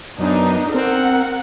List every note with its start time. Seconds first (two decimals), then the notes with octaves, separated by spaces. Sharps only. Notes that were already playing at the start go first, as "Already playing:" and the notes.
0.19 F#2 B3 D4 D#4
0.74 C4 A#4 F#5